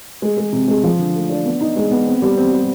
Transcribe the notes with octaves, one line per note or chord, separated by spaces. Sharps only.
G#3
G#3
C3
G#3
F3
D3
A3
D4
B3
D#4
G#3
B3
C4
G3
C4
G3